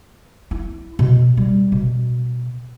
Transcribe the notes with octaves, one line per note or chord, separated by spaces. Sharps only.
E4
B2
G3
B2